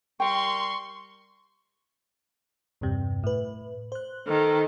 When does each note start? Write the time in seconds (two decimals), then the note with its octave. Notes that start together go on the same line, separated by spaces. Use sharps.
0.20 G3 A#4 G5 C6 C#6
2.81 E2 G2 C3
3.24 A2 B4
3.92 C5 F#6
4.27 D#3 A4